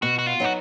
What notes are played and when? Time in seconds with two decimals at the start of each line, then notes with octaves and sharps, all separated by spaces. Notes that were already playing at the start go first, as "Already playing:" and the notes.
0.02 B2 F#4
0.19 F#4
0.26 F4
0.40 F#3 B3 D#4 F#4